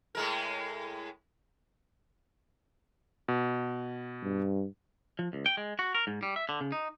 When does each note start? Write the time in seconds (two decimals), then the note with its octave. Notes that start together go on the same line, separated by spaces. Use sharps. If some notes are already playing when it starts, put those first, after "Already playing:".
0.15 A2 G#3 A#4
3.28 B2
4.23 G2
5.19 F3
5.33 C#2
5.46 G5
5.57 G#3
5.79 F#4
5.95 A#4
6.07 G#2
6.23 G3
6.36 E5
6.49 D3
6.61 C#3
6.72 D#4